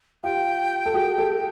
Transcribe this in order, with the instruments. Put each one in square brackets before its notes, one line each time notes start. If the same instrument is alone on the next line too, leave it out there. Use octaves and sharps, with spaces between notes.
[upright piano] F4 G4 [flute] G5
[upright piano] A4
F#4 G#4
G4 A4